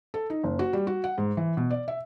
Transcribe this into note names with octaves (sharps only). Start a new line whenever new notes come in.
A4
D#4
F#1
F#4
G3
F#4
F#5
G#2
E3
B2
D5
E5